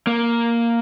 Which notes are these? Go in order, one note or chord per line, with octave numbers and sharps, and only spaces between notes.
A#3